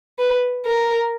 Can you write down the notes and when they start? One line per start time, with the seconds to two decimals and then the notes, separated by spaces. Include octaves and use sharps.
0.19 B4
0.66 A#4